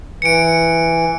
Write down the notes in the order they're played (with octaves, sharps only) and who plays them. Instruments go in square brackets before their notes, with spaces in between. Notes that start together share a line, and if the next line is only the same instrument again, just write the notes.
[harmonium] E3 [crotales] C#7 D7